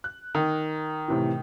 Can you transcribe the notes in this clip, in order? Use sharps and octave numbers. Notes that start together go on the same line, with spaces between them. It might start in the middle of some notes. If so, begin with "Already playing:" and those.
F#6
D#3
A2 C3 E3